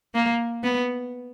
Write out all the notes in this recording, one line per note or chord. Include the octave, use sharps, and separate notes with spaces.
A#3
B3